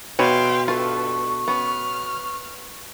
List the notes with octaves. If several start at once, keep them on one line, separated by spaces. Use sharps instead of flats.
B2 G#4 B4 C#5 E5 F5 G5 C6
G2 F4 A4 B4 E5 C#6
B3 C#4 F6